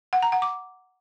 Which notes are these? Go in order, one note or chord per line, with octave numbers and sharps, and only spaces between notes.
F#5
A#5
F#5
D6